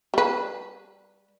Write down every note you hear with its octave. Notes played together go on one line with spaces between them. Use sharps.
G3 B4